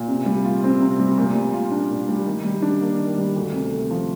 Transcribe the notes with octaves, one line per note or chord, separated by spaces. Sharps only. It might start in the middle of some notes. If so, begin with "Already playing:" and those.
Already playing: A#2
C3
G3
F4
C4
C3
G3
A#2
G3
F4
D4
A#2
G3
D#3
G3
D4
A#3
D#3
G3
D2
C3
A3
F3